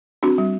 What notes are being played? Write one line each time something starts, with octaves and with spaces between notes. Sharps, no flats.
C4 D4 F#4
G3